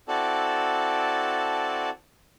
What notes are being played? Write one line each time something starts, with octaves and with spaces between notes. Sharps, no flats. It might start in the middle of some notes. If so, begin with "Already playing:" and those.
C4 E4 F#4 A4 D5 A5